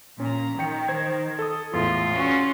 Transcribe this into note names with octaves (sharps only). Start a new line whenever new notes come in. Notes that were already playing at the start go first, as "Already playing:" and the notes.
A#2 C#4 A#5
D#3 G5 C#7
C5 G#6
A4 D#6
E2 A2 F4
C#4 F#4